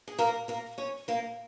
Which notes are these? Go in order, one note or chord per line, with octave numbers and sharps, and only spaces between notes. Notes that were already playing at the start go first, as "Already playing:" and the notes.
G#4
A#3 A#4
A#3 A#4
C#4 C#5
A#3 A#4